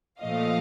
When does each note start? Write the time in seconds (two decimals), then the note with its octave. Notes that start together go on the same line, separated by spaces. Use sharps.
0.21 A#2 F3 A3 D#5 F5